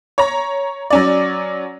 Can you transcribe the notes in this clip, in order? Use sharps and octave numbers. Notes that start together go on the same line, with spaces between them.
C#5 A#5
F#3 C#4 D5